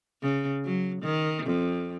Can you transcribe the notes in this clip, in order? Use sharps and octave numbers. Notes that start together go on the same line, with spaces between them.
C#3
F#3
D#3
F2